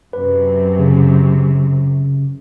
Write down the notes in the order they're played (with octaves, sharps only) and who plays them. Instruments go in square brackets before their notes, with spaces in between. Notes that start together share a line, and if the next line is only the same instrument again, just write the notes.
[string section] F#2 C3 [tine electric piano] B4
[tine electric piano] C#3